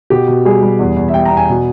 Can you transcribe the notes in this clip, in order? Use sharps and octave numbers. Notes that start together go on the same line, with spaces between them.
B2 G4
B2
G3 G#4
G3
E2
E2
E5
G3 G5
A#5
E2
G#5
B2